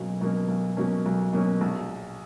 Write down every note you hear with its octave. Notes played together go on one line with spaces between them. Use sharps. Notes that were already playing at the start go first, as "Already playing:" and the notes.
Already playing: B1 B2 F#3 A#3 C#4
B2 F#3 A#3 C#4
B1
B2 F#3 A#3 C#4
B1
B2 F#3 A#3 C#4
A#1